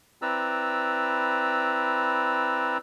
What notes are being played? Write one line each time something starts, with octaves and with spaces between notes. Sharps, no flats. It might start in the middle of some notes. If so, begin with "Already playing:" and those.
C4 E4 B4 D5 A#5 E6